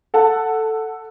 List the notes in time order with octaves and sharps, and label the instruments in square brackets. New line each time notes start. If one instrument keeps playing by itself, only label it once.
[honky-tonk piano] A4 F#5 A5